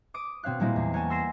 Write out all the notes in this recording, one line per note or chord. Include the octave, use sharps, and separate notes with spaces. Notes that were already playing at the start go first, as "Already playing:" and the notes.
D6 D#6 D7
B2 C4 C#5 F5 F#6
A#2 G3 G#3 A#3 C4 E4
E2 C7
A#4 C#5 F#5 G#5 A5
C6 E6 A#6 C7 D#7 E7